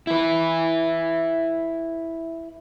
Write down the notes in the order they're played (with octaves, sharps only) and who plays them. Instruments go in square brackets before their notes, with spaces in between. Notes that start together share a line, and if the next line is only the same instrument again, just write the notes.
[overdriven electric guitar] E4 B4